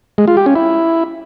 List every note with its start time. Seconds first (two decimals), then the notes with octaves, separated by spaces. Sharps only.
0.18 G#3
0.27 F4
0.37 G4
0.46 C#4
0.56 E4